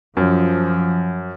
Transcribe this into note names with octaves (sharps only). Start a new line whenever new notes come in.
F#2 F3